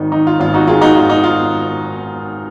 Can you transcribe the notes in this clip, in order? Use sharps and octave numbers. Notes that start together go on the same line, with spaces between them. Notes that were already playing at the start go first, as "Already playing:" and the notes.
Already playing: G#1 D#3 D#4
D#3 D#4
F4
G#1 F4
D#4 F#4
D#3 F4 G#4
D#4 F#4
G#1 F4
D#4
F4